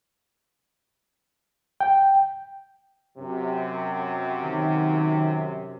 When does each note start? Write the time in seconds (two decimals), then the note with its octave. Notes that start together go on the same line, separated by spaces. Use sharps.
1.80 G5
3.17 F#2 C3
4.44 D#3